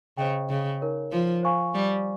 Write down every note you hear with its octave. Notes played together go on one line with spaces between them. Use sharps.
C#3 C5 D#5 G5
C#3
D#4 A#4 C#5
F3
C5 F5 G#5 C#6
G3